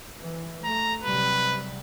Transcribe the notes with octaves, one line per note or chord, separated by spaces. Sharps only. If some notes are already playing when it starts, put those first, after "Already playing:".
E3
A3 A#5
C3 F#3 G3 B4